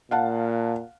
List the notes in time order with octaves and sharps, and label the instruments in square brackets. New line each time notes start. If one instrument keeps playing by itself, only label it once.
[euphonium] A#2 [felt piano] F5 F#5 A5